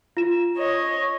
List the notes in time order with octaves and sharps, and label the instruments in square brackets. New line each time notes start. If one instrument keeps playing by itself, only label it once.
[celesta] F4 E7
[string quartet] C#5 D#5